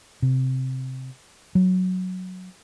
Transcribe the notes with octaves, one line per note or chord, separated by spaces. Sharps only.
C3
F#3